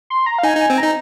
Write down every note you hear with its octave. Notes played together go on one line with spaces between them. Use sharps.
C6
A#5
F5
D#4 G#5
D#4
G#5
C4
D#4 A#5